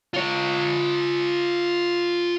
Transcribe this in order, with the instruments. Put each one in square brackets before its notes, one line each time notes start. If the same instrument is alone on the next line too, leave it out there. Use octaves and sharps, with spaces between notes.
[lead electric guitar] F4 C#5